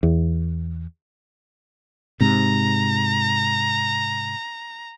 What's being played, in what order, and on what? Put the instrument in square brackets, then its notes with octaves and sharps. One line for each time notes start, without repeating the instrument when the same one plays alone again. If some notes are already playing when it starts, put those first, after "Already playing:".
[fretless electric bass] E2
[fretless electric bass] G#2 C3 [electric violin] A#5